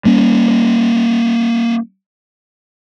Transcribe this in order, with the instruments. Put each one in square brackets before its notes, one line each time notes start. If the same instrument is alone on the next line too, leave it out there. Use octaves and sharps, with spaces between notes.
[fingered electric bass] G3 A#3 C#4